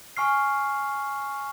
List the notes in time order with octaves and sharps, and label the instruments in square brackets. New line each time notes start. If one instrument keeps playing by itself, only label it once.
[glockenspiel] G#5 C#6 F6 C7